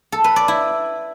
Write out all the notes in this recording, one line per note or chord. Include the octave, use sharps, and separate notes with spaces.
A4
B4
D5
E4